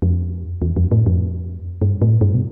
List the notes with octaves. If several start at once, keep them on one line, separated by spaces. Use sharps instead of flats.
F2
E2
F2
A2
F2
G2
A2
G2
B2